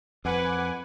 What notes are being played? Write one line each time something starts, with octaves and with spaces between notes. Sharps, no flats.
F2 B4 F#5 G#5 D6